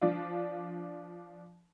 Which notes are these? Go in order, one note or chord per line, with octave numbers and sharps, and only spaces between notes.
F3 D4 F4